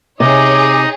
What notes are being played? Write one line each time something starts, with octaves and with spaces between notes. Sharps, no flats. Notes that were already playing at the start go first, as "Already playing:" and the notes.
C3 D#4 G#4 C#5 D#5 D6